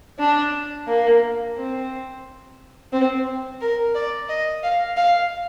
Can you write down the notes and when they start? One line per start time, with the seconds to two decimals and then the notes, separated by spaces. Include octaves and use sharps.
0.19 D4
0.87 A#3
1.56 C4
2.92 C4
3.61 A#4
3.95 D5
4.29 D#5
4.63 F5
4.97 F5